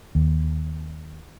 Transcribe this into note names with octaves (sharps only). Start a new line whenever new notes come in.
D#2